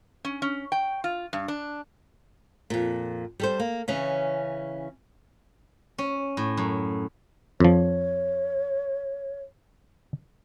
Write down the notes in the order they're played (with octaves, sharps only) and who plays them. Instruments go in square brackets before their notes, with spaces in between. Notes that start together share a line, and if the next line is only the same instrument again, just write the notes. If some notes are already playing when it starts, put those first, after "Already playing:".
[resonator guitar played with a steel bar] C#4
C#4
G5
F4
G2
D4
[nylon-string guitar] F2 A#2
G3 A4 C5
A#3
C#3 E3 C#4
[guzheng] C#4
A2
F#2
[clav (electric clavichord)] F2 F3 [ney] C#5